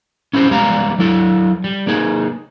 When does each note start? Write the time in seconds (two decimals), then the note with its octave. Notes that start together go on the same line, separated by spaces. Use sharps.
0.33 C#4 E4 G4 C5
0.51 G3 G#3 B3 D5 F5 A#5
0.98 F#3 E4 A4
1.64 G3
1.87 A#3 D#4 G#4